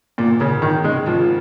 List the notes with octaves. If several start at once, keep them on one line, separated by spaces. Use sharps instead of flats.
G#1 A#2
G#1 C#3
G#1 D#3
C#3 G#3
G#1 F3